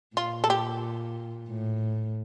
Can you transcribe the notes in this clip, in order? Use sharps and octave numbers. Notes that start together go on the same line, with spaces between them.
A#2 F4
A4
G4
A2